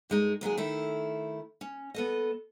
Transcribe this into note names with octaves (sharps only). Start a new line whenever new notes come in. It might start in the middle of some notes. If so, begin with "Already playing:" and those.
G2 G#3 D#4
D#2 F#3 G#3 G#4
D#3 A3 E4
C#4
B3 A4 D#5